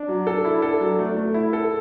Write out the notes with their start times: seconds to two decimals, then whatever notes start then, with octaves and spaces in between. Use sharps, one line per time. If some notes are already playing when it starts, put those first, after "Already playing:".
Already playing: D4
0.08 F#3
0.27 A4
0.45 E4
0.62 A4
0.80 F#3
0.99 A3
1.17 A3
1.34 E4
1.53 A4